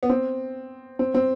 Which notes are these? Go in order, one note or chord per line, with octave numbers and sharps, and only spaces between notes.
B3
C4
C4
C4